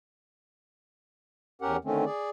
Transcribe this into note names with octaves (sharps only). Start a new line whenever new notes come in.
E2 C#4 G4 A#4 F#5
D3 D#3 A3 C4 C#4
G#4 D5